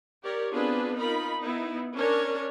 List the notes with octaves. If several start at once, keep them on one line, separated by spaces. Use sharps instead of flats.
G4 A#4 C#5 D5
B3 C4 D4 F4 G#4 B4
D#4 F4 A#4 B5
B3 D#4 E4
C#4 D4 A#4 C#5